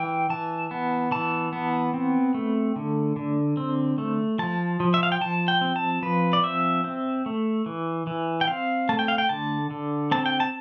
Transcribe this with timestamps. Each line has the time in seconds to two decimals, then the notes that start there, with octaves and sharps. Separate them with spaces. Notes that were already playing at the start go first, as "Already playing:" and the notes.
Already playing: E3 G5
0.30 E3 A5
0.71 B3
1.11 E3 A5
1.53 B3
1.94 C4
2.34 A3
2.76 D3
3.16 D3
3.57 C4
3.98 A3
4.39 F3 A5
4.80 F3
4.94 E5
5.03 F5
5.12 G5
5.21 F3 A5
5.48 G5
5.61 C4
5.76 A5
6.02 F3 B4
6.33 D5
6.43 C4 E5
6.84 C4
7.26 A3
7.66 E3
8.07 E3
8.41 G5
8.48 C4 F5
8.89 A3 A5
8.99 G5
9.08 F5
9.18 G5
9.29 D3 A5
9.71 D3
10.11 C4 A5
10.26 G5
10.40 A5